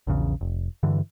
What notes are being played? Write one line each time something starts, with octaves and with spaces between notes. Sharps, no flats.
A#1 E2 C#3
F1
G2 D3 E3